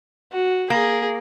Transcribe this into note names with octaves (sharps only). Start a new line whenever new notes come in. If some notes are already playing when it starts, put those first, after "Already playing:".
F#4
A#3 G#4